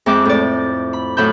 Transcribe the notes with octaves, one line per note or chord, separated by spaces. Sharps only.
F2 G#3 E5 G5 D6 F#6
A2 D5
B5
A2 F#3 E5 B5 G6